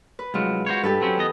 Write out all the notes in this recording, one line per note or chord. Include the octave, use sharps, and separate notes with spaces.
B4
C2 F#3 G#3 F4
F#4 C5 C#5
G2 G4 A4 B4
F#3 C4 C#4
E2 B3 D#5